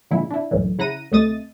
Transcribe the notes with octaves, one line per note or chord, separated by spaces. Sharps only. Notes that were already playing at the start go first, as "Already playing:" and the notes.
A#2 D3 F3 G#3 E4
D4 E4
C#2 F#2 A2 D3 E3
C#3 E4 F#5 A#5 A#6 D#7
D2 C3 A3 D#5 D#6 A6